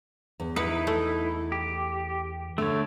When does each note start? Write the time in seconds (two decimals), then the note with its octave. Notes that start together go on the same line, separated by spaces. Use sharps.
0.40 E2
0.56 D#4 E4 B4 F#5
0.87 A3
1.52 G4
2.58 D3 A3 C#5